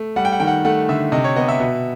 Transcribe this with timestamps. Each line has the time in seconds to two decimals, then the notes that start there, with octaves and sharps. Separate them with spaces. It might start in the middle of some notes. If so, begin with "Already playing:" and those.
Already playing: A3
0.16 G3 F#5
0.25 G5
0.32 F#5
0.40 D#3 G5
0.47 F#5
0.65 A3 F#5
0.89 D3 E5
1.12 C3 D#5
1.24 C#5
1.36 B3 D#5
1.49 E5
1.60 B2